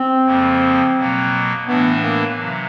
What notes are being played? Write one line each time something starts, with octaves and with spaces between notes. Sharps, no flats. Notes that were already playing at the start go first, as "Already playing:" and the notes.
Already playing: C4
F2 C#3 F3 A#3
B2 F#3 A#3
A2 E3 A3 B3 D4
A#3
C3 F#3